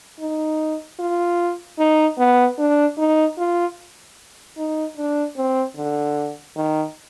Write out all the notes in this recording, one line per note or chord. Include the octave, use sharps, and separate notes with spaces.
D#4
F4
D#4
B3
D4
D#4
F4
D#4
D4
C4
D3
D#3